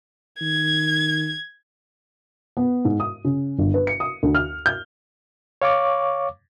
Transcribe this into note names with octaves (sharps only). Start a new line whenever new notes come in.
D#3 G#6
B3
G#2
D#6
C#3
G1
B4
C#7
D#6
D2
F6
G6
C#5 F5 C#6 D6